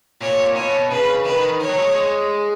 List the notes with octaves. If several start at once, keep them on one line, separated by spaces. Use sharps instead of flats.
A#2 C#5
B2 C#5
C#3 B4
D#3 B4
C#5
F#3
G#3
G#3